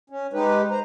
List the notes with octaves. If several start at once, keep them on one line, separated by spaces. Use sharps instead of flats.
C#4
G#3 D#4 G4 B4
C5 A#5